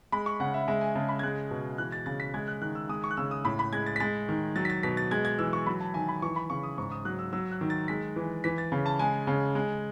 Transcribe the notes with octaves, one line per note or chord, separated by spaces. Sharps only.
G#3 B5
C#6
C#3 F#5
E5
G#3 E5
G#5
C#3 A5
B5
G#6
G#3 F#6
B2
E3 F#6
A6
C#3 A6
B6
G#3 G#6
F#6
D#3 F#6
E6
G#3 D#6
C#6
F#6
C#3 E6
D#6
A2 B5
B5
G#3 G#6
A6
B6
G#3 A6
D#3
F#3 A6
B6
A6
B2 B6
A6
G#3 G#6
G#6
E3 E6
C#6
F#3 B5
A5
D#3 G#5
B5
E3 C#6
B5
C#3 C#6
D#6
G#2 C#6
D#6
F#3 F#6
E6
F#3 E6
F#6
D#3
A6
G#3 B6
E3
E3 B6
A6
C#3
A5
G#3 G#5
C#3
G#3